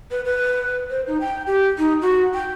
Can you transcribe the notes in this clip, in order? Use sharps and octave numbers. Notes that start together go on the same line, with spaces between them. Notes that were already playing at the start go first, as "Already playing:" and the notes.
B4
B4
C5
D#4
G5
G4
D#4
F#4
G5